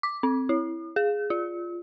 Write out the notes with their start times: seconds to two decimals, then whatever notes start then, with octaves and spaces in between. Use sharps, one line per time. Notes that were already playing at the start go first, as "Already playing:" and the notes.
0.03 D6
0.23 C4
0.49 E4
0.96 G#4
1.30 F4